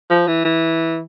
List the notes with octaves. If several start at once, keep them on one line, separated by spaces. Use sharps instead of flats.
F3
E3
E3